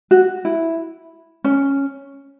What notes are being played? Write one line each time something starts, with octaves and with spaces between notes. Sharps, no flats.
F#4
E4
C#4